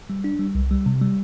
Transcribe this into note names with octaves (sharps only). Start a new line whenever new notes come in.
G3
D4
G3
C2
G3
C3
G3